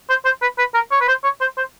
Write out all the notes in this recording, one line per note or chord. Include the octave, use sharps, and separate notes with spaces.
C5
C5
B4
B4
A#4
C#5
B4
C5
C#5
C5
C5